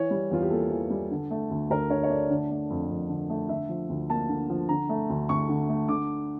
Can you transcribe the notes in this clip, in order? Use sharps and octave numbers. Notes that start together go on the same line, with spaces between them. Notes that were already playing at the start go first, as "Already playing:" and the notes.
Already playing: E3 C#5
G3
E2 F4
G4
A#3 A4
E3
G3
D3
A3
D2
D2 A#4
D3 C#5
C#5
A3 D5
D3
A3
F2
F2
D3
A3
D3 E5
F3
D2
A#3 A5
D3
F3
D3 A#5
A3
D2
D2 C#6
D3
A3
D3 D6